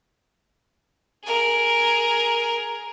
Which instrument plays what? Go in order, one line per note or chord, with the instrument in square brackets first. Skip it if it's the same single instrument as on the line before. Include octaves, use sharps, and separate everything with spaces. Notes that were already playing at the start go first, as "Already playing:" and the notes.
[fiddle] G#4 A#4